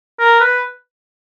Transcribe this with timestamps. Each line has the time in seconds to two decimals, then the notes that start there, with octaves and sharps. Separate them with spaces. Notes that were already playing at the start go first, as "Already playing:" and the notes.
0.20 A#4
0.40 B4